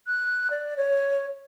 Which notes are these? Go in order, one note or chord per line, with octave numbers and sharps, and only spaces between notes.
F#6
D5
C#5